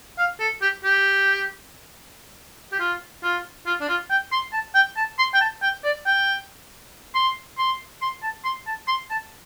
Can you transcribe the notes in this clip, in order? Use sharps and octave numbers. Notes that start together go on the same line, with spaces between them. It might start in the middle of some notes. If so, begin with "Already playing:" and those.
F5
A4
G4
G4
G4
F4
F4
F4
D4
F4
G5
C6
A5
G5
A5
C6
G5
A5
G5
D5
G5
C6
C6
C6
A5
C6
A5
C6
A5